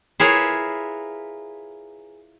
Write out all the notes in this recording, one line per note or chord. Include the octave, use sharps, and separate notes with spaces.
E4 F4 G#4 A#4 B4 C#5